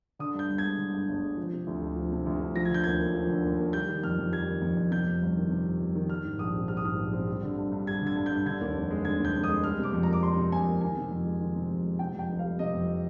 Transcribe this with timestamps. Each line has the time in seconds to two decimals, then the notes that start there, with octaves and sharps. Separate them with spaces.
0.19 D3 D#6
0.34 G2 G6
0.50 G1
0.58 G#6
0.64 G#3
0.78 D3
0.93 G2
1.09 G1
1.24 G#3
1.37 F3
1.53 C3
1.67 D2
1.82 D2
1.96 F3
2.12 C3
2.26 D2
2.40 D2
2.56 F3 A#6
2.65 G#6
2.71 D3 G6
2.84 D#2 G#6
3.00 A#3
3.15 F3
3.29 D3
3.44 D#2
3.59 A#3
3.73 G3 G6
3.88 D#3
4.03 F2 F6
4.19 F2
4.32 G3 G#6
4.48 D#3
4.62 F2
4.77 F2
4.91 C3 G6
5.06 F2
5.22 G1
5.37 D#3
5.50 C3
5.66 F2
5.80 G1
5.95 D#3
6.09 G3 F6
6.25 G#2
6.39 A#1 D#6
6.54 C4
6.68 G3 F6
6.77 D#6
6.84 G#2 F6
6.99 A#1
7.13 C4
7.27 G3
7.42 D3
7.57 G2
7.72 G2
7.86 G3 G#6
8.02 D3
8.07 G#6
8.16 G2
8.26 G6
8.31 G2
8.46 D3 G#6
8.61 D#2
8.76 F1
8.91 G#3
9.05 D3 G#6
9.19 D#2
9.25 G6
9.35 F1
9.44 D#6
9.48 G#3
9.64 G3 F6
9.79 C3 D6
9.93 F2
10.03 A#5
10.08 A#3
10.13 D6
10.22 G3 C6
10.37 C3
10.52 F2 G#5
10.67 A#3
10.81 D#3 G#5
10.97 C3
11.11 F2
11.26 G#3
11.41 D#3
11.55 C3
11.71 F2
11.85 G#3
11.99 C3 G5
12.14 F2 G5
12.29 F1
12.39 F5
12.44 G3
12.59 C3 D#5
12.73 F2